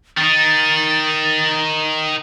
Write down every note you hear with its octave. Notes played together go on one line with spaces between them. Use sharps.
D#3 D#4 A6